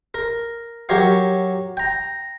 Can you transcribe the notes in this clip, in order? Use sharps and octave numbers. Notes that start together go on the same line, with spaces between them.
A#4
F#3 G4 A#4 C#5 F5
G5 A#5